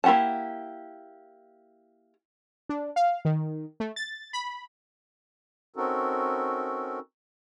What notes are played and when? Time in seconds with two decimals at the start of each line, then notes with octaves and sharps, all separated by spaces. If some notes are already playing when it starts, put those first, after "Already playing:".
0.04 A#3 E4 G4 F#5 A5
2.69 D4
2.96 F5
3.25 D#3
3.80 A3
3.96 A6
4.33 B5
5.76 C4 C#4 D#4 F#4 A4 A#4